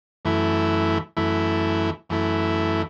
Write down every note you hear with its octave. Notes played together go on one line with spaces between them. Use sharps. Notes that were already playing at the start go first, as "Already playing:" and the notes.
F#2 E3 A3 E4
F#2 E3 A3 E4
F#2 E3 A3 E4